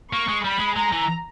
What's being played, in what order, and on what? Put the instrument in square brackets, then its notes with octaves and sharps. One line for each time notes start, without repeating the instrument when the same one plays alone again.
[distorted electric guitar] A#3 [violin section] C#6
[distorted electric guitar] G#3
[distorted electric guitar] G3 [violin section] B5
[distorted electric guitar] G#3
[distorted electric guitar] G#3 [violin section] A#5
[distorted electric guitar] E3